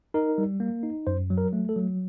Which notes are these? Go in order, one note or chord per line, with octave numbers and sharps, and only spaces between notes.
D#4 A#4
G3
A#3
D#4
F#2 C5
F#3
A#4
A3
A4
F#3